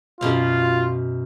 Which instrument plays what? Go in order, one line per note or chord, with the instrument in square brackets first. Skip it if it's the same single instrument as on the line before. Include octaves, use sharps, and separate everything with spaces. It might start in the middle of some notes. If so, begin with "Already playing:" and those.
[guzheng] F#2 B2 F5 [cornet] F4